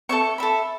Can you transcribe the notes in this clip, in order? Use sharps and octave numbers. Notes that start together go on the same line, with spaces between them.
A4 C#5 E5 C#6
A4 E5 B5